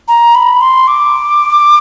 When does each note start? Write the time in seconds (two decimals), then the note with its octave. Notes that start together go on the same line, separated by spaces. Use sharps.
0.08 A#5
0.35 B5
0.61 C6
0.88 D6